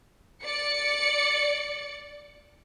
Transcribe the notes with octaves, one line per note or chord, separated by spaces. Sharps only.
D5 C#7